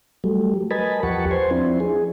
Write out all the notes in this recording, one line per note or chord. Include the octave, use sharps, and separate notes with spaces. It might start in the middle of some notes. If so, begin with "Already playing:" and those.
F#3 G3 A3
A#4 B4 D#5 G#5 A5 B5
E2 F3 G4 F#5 A5 C#6
B4 C5 G#5 C6
F3 C4 D4 E4
G#4